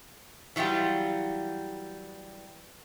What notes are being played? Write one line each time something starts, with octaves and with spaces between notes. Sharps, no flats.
E3 F#3 G3 F4 G4